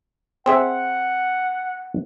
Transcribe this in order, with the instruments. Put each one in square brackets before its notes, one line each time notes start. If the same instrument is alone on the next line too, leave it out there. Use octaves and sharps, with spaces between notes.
[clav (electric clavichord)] C4 G#4 E5 [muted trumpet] F#5